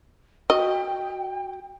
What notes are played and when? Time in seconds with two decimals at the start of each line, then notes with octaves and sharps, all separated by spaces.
0.50 F#4 D#5 G5